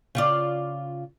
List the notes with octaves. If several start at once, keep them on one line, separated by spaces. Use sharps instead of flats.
C#3 F4 D5